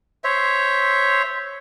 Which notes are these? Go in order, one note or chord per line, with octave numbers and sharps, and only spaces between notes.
C5 C#5 E5